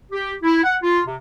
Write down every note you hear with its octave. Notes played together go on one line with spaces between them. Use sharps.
G4
E4
F#5
F4
C3